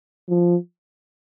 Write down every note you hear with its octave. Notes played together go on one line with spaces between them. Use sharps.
F3